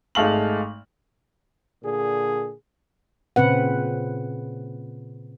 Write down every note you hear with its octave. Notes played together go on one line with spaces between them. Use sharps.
G#1 G#3 A3 F5 F#7
A#2 D3 G#4
A#2 C#3 C4 B4 F#5